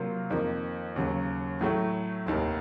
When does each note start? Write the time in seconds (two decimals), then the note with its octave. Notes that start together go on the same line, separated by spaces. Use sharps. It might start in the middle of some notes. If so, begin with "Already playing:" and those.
Already playing: C3 F#3 A#3 F4
0.30 F2 D#3 A#3
0.96 D#2 C#3 F#3
1.61 A2 F#3 A3
2.26 F1 D#2 D#3